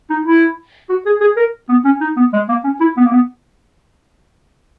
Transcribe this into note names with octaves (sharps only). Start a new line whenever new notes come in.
D#4
E4
F#4
G#4
G#4
A#4
B3
C#4
D#4
B3
G#3
A#3
C#4
E4
B3
A#3
B3